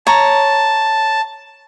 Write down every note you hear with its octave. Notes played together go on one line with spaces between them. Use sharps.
C#5 A5 A#5